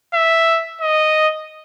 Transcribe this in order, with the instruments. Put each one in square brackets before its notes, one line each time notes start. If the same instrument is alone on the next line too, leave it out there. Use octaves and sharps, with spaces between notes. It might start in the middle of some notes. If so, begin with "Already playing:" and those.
[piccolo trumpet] E5
D#5